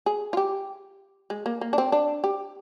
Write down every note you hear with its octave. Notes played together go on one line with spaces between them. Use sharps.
G#4
F4
G4
G#3
A#3
A#3
D4
C4
D4
G4